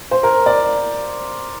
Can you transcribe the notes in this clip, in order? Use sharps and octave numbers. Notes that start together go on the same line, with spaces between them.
C5
A#4
D5